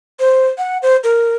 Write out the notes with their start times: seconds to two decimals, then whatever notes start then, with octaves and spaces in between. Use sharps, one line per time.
0.20 C5
0.58 F#5
0.82 C5
1.04 A#4